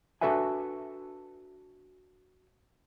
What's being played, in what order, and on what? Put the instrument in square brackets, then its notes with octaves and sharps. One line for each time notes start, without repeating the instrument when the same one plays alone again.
[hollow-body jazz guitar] D4 F#4 A4 B4 E5 G#5